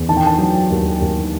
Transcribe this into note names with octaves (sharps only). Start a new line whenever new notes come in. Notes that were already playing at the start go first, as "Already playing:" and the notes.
Already playing: E2
D#3 A5
G5
A5
F#3
D#2
D#2